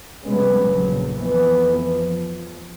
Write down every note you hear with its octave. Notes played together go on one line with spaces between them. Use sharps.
F2 C3 G3 G#3 B3 C#4
A#1 F#2 C#3 F#3
F2 E3 F3 B3
F3